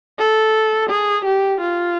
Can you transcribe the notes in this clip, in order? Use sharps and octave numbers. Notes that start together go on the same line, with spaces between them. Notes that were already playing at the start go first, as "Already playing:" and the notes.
A4
G#4
G4
F4